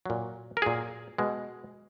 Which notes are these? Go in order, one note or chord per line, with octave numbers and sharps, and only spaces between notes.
A#2 F#3
A#4
A#2 F#3 G#4
B2 G#3